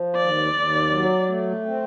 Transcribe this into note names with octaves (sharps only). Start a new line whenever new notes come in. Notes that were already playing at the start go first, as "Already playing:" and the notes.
Already playing: F3
D#2 D5
D#2
F#3
A3
C4